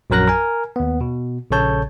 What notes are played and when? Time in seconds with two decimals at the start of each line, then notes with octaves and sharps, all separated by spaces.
0.10 A#1 F#2 F#3 A#4 F#6 A#6
0.28 A#4 G#5
0.76 D#2 B3
1.01 B2
1.51 A#1 C#3 A4 C#5 A5 G6